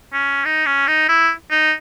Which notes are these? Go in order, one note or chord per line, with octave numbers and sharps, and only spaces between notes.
C#4
D#4
C#4
D#4
E4
D#4